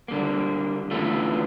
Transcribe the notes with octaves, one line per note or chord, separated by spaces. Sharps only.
D3 G3 A#3
E2 D3 A3 C#4 F4